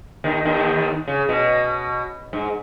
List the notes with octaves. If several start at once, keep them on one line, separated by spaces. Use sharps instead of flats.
D#2 D#3
D#2 D#3
C#3
B2
G#2